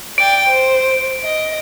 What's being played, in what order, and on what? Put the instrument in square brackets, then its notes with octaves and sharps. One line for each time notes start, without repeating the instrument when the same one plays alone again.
[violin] D5 G5 [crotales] D7
[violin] C5
D#5